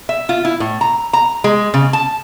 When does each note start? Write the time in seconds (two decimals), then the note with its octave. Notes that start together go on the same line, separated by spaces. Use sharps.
0.09 E5
0.29 F4
0.45 E4
0.60 A2
0.81 A#5
1.13 A#5
1.44 G#3
1.74 C#3
1.93 A5